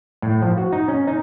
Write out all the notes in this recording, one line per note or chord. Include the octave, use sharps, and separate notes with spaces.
A2
F3
F#4
D#4
C#4
D#4